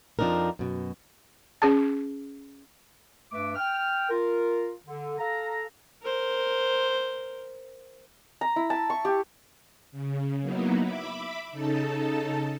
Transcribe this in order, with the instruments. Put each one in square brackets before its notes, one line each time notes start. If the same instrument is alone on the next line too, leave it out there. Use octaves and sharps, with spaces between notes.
[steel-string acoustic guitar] F2 F3 C4 D4 D#4 A#4
F#2 B2
[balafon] C#4 G#4 A5
[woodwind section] G2 A3 B4 E5 D6
G5 F6
F4 A#4
D3
A4 F5 A#5
[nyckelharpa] A#4 C5
[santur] A#5
E4
A5
C#6
G4
[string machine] C#3
F#3 A#3 B3 D#4 E4
E5 B5 D6
C#3 D#4 A4 A5